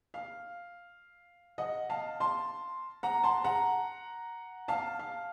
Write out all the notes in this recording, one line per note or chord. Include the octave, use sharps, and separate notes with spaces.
F5
D#5 F#5
F5 A5
A5 C6
F#5 A#5
A5 C6
F#5 A#5
F5 A5
F5